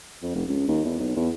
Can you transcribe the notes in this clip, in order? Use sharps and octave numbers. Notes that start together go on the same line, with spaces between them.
F2
F1
C#2
D#2
E2
B1
E2